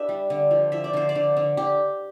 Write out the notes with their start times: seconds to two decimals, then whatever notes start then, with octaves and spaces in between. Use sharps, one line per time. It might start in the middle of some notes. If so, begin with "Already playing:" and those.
Already playing: D4 G4 B4 E5
0.09 G3
0.30 D3
0.51 F3
0.72 F3 E5
0.84 D5
0.93 D3 C5
1.09 D5
1.15 D3
1.37 D3
1.57 D3 G4